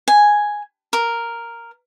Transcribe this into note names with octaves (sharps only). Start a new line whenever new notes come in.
G#5
A#4